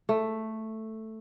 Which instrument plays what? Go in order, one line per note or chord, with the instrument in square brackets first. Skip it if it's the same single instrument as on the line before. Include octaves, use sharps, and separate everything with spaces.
[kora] A3